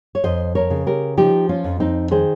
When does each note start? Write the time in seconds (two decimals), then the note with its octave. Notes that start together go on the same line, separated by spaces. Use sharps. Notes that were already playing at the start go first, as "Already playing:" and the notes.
0.15 C#5
0.24 F2 C5 D#5
0.55 A#4 C#5
0.70 C#3
0.87 G4 A#4
1.17 F3 D#4 G4
1.49 C#4 F4
1.64 F2
1.80 C4 D#4
2.11 D#3 G#4 C5